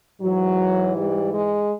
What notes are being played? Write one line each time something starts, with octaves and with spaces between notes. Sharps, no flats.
G#2 E3 F#3
G3
G#3